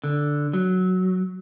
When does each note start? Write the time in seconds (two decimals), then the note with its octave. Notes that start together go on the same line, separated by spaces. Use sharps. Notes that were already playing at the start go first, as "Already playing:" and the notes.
0.04 D3
0.53 F#3